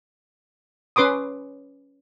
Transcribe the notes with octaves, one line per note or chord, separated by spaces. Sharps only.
C#4 B4 C6 D6 D#6